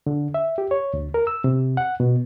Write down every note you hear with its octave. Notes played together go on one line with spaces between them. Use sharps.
D3
E5
G4
C#5
D2
A#4
E6
C3
F#5
B2